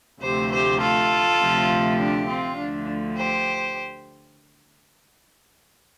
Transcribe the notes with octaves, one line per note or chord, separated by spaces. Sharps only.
D2 C3 F3 A3 G4 C5
G4 C5
F4 A4
D2 C3 F3 A3
D4 G4
C4 F4
D2 D3 F3 A3 D4
G4 C5